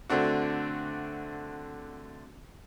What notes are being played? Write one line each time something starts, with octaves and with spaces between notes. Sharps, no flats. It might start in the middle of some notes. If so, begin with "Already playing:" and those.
D3 A3 C4 D4 F#4